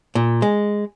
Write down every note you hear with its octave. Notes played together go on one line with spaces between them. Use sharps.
A#2
G#3